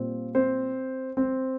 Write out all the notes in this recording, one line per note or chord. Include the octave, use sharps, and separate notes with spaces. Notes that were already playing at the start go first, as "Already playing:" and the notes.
Already playing: A#2 G3 C4
C4 C5
C4 C5